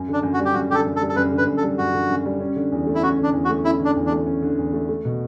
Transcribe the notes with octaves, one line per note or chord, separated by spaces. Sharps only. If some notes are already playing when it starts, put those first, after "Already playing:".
Already playing: F#2
D3
D4
F#2
F#4
G3
G4
F#2 F#4
D3 G4 A4
F#2
A4
G3
A4
F#2 B4
D3
B4
F#2
A4
G3
F#2 F#4
D3
F#2
G3
C#4
D3
E2
A3
E4
C#4 F#4
D3
D4
E2
F#4
A3
C#4 E4
D3
D4
E2
D4
A3
C#4
D3
E2
A3
A3
B2